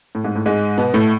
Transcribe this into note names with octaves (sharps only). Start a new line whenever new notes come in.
A2
G#2
A2
G#2 G#3
B2 B3
A2 A3